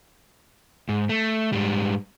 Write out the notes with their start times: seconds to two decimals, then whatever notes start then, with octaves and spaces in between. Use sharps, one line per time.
0.89 G#2
1.09 A3
1.53 G#2 G3